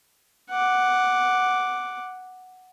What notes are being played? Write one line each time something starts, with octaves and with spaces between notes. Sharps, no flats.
F#5 D6